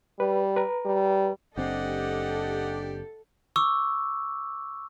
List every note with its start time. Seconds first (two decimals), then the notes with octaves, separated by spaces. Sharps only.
0.20 G3 B4
0.56 B4 A#5
0.85 G3
1.57 F#1 C4 D4 G4 A4 D#5 F#5
3.56 C#6 D6 E6